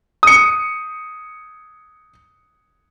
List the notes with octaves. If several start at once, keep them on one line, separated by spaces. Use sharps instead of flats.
D#6 C#7